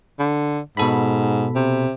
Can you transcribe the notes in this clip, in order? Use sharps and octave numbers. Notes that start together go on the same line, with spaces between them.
D3
G#2 B2 A4 B5
C3